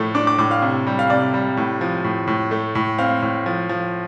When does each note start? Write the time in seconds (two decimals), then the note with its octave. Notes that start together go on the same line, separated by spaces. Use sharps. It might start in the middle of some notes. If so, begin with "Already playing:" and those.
Already playing: A2 F3 A3
0.15 D4 D6
0.27 D6
0.38 A2 D6
0.51 F5
0.62 C3
0.87 G3
0.99 F5
1.10 C3 D5
1.34 G3
1.57 A2
1.81 F3
2.04 A2
2.27 A2
2.51 A3
2.75 A2
2.98 C4 F5
3.22 A2
3.46 F3
3.69 F3